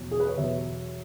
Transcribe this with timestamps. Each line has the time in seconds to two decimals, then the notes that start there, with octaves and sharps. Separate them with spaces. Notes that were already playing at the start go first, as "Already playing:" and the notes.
Already playing: E2 B2 F#3
0.11 G#4
0.20 B4
0.28 C#5
0.37 E2 B2 F#3 E5